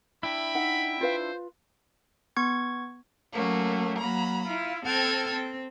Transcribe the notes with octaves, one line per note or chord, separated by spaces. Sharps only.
D4 E4 E5 G5 B5
D#4 F#5
F4 B4 C5 F5
B3 C#6 G#6
F#3 A3 A#3 C#4
F#3 A#3 A#5 B5
E4 F4
C4 A4 G5 A5 F6 G#6
C4